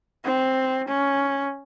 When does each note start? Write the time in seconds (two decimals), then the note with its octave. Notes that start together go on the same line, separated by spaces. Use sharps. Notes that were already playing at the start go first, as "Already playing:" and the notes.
0.25 C4
0.88 C#4